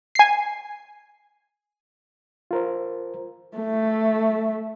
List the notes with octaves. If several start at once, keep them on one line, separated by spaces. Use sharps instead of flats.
G#5 C7
F4 A#4 C5
A3